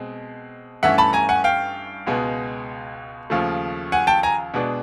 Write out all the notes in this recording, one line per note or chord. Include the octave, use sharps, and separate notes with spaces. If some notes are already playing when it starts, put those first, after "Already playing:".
Already playing: B2 G#3 C4
G2 E3 A3 C#4 E5 F#5
A5 B5
G#5 A#5
F#5 G#5
F5 G5
C#2 B2 G#3 B3
D#2 C#3 F3 A3
F#5 G#5
G5 A5
G#5 A#5
B2 G#3 B3 D4